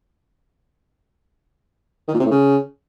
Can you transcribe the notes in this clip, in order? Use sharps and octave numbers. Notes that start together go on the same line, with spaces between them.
D#3
A#2
C3
A2
C#3